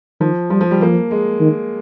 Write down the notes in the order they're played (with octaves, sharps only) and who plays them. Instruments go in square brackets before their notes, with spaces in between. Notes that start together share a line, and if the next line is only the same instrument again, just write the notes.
[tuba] D#3 [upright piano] F3
[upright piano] F3 [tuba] G3
[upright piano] F3
G3
[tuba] F3 [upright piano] A#3
[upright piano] G#3
[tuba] D#3